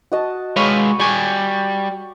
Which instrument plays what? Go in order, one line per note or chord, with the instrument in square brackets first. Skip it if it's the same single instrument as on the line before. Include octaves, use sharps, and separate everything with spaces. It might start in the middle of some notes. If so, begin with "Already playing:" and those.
[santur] F#4 D#5 A5
[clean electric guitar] G#3 B4 F5 [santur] C#5 B5
[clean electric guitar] G3 G#5 [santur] C#6 D6